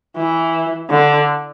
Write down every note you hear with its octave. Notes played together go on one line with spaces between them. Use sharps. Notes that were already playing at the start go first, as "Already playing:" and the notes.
E3
D3